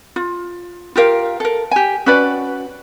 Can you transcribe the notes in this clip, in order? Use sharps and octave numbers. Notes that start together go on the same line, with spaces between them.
F4
F4 G4 A#4 F5
A4 A#4
G4 G#5
C#4 F#4 B4 D5